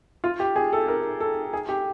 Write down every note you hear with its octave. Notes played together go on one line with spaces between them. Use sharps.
F4
G4
G#4
A4
A#4
A4
G#4
G4